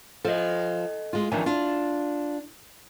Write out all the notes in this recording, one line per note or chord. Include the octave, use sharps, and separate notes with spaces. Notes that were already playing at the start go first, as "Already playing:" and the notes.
F3 A4 D#5
G#3 F4
F2 D#3 E3 D4 G#5
D4 F4